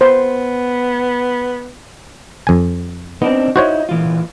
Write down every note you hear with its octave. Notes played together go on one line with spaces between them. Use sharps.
B3 C5
F2 G#5
B3 C4 D4 D#4
D#4 E4 F#4 C5 C#5
A#2 E3 F4